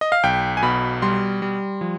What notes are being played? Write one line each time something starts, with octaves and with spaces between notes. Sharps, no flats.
D#5
F5
B1 G5
G#5
B2 B5
G3 C6
G3
F3